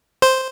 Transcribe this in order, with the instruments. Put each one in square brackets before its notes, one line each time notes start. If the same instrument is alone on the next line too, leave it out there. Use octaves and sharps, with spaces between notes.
[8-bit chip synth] C5